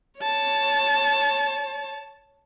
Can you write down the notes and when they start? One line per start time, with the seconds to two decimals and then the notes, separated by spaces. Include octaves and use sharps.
0.20 C#5 A5